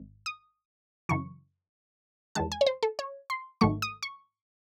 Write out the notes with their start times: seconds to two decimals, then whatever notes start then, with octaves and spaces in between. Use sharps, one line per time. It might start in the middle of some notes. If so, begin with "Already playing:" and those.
Already playing: G#1
0.26 D#6
1.09 F#2 C#3 E3 C#6
2.35 E2 D#3 G#3 A5
2.52 G#5
2.61 C#5
2.66 C5
2.83 A4
2.99 C#5
3.30 C6
3.61 G#1 G#2 D#3 F#3 A3 C#6
3.82 D#6
4.03 C#6